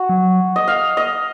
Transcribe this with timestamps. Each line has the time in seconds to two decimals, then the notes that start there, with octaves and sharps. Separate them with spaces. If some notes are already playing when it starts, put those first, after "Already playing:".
Already playing: F#4
0.09 F#3
0.56 D#5
0.68 F5
0.97 D#5